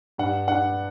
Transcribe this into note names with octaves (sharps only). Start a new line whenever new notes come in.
G2 F#5
D4 F#5